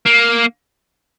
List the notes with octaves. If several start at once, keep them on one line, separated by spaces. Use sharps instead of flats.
A#3